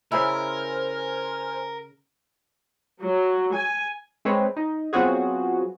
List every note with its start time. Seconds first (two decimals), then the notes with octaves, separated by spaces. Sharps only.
0.12 C#3 E4 A#4 C5 G#5 F6
3.00 F#3
3.54 G#5
4.25 G#3 C4 B4 C#5
4.56 D#4
4.93 F#3 B3 C4 F4 F#4 G#4